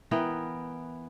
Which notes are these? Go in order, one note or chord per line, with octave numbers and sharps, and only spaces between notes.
E3 B3 A#4 G5